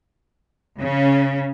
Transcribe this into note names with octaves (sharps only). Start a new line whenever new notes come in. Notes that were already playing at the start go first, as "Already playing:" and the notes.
C#3 C#4